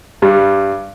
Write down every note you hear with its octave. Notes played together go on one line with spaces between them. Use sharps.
G2 G3